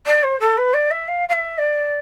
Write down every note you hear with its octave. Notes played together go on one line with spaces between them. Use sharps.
D5
C5
A4
B4
D5
E5
F5
F5
E5
D5